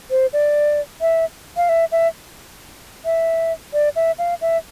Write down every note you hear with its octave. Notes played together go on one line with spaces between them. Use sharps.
C5
D5
E5
F5
E5
E5
E5
D5
E5
F5
E5